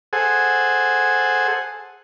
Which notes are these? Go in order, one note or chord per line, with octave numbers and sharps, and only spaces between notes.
G#4 A4 C5 F#5 G#5